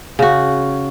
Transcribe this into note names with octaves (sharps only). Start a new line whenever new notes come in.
C#3 F#4